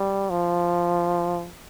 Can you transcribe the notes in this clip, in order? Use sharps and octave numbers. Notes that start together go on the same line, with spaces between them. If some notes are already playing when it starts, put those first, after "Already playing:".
Already playing: G3
F3